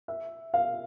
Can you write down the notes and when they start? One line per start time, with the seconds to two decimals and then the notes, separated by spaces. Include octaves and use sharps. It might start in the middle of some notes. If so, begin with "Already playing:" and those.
0.08 E5
0.54 F5